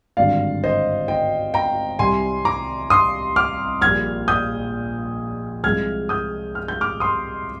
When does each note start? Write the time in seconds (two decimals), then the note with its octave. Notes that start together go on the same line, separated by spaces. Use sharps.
0.17 G#1 G2 D3 D5 F5
0.64 C5 D#5
1.08 D#5 G5
1.54 G5 A#5
1.99 C2 C3 G3 G#5 C6
2.45 A#5 D6
2.90 C6 D#6
3.36 D6 F6
3.82 A#1 A#2 G3 F6 G#6
4.28 D#6 G6
5.64 C2 C3 F3 G#3 F6 G#6
6.09 D#6 G6
6.55 F6
6.68 G6
6.81 D6 F6
7.00 C6 D#6